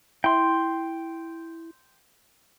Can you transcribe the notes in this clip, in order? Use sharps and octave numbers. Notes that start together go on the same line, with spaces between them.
E4 G5 C6